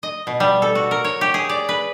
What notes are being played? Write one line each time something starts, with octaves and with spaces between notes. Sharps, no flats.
D#5
B2
G3
A4
F#4
A#4
C#5
G4
G#4
D5
B4